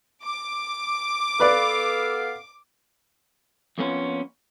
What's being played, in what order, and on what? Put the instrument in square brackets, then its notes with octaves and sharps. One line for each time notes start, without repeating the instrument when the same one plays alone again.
[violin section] D6
[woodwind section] B3 A4 F5 [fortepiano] B4 D5
[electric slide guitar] F2 A#3 B3 C#4 F4